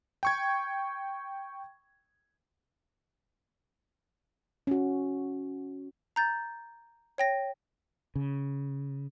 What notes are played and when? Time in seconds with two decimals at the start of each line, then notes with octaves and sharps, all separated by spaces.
0.23 G5 C#6 G#6
4.67 C#4 F#4
6.16 A#5 G6 A6
7.18 C#5 G5 A#6
8.15 C#3